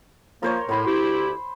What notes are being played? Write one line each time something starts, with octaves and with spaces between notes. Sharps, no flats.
F3 A#3 A#4 C5 C#5
A2 C5 B5 C6
D2 E4 G4